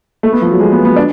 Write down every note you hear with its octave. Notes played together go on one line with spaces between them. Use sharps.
A3
B3
F3
F#3
G#3
B3
B3
D4